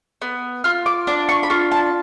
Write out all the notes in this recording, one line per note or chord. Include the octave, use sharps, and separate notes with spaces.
B3
F4 F6
D6
D4 D6
C#6
B5
F4 C#6
A5